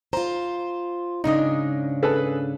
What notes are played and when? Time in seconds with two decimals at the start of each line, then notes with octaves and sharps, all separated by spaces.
0.13 F4 C5 A#5
1.24 G#2 C#3 D4 D#4 D#5
2.03 G#4 A4 B4